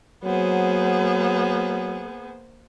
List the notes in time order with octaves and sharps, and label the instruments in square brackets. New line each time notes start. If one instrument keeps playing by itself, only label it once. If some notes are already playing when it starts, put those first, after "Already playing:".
[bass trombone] F#3 [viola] A#3 C5 [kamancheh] B3 G#4